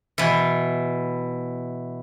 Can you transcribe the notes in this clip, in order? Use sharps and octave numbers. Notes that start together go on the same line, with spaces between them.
B2 E3